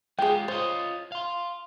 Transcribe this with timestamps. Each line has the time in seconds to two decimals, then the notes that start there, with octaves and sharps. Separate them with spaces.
0.19 G#3 F4 G4 G#4 G5
0.48 F4 C5 C#5 D#5
1.12 F5 C6